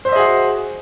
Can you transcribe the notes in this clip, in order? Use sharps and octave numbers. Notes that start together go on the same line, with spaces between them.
F#4 G#4 C5 D#5 E5